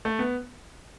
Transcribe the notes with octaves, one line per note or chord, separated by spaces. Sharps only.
A3
B3